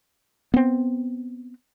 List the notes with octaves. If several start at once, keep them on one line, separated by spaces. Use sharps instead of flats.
B3 C4